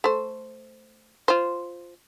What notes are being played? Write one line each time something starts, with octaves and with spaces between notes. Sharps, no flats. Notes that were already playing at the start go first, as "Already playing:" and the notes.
A3 C5
F4 C5